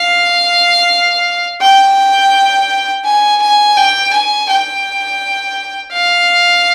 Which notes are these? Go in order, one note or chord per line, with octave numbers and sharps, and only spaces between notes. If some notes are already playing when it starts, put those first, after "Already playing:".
Already playing: F5
G5
G#5
G#5
G5
G#5
G5
F5